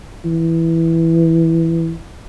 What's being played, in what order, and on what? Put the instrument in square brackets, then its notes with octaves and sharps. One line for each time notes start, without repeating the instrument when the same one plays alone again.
[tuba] E3